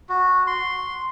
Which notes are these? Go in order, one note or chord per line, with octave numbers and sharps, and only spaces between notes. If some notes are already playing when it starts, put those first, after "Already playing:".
F#4
C6